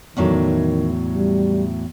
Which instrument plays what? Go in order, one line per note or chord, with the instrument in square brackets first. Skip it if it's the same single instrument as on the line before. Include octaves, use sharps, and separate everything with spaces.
[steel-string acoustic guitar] E2 A2 F#3 [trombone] D#3
[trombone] G3